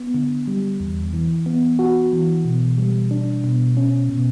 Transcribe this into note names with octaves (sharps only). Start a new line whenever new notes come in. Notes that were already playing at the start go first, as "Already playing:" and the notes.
Already playing: B3
D3
G3
E2
E3
B3
F#4
E3
B2
G3
D4
B2
C#4
B2